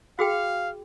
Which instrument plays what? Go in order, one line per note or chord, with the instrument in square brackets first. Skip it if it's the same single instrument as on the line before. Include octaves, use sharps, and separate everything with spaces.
[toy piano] F#4 G#4 G5 [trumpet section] F5